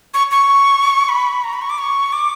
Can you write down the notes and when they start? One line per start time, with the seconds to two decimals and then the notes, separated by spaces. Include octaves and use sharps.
0.14 C#6
0.31 C#6
1.09 B5
1.44 A#5
1.53 B5
1.62 C#6
1.70 D6
1.78 C#6
2.13 D6